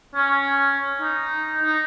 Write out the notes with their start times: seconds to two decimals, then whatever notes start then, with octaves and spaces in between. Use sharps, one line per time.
0.15 C#4
1.01 D#4
1.63 D#4